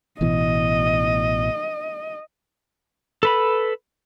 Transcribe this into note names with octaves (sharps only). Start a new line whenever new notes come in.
A1 B2 E3 D#5
A4 B4 B5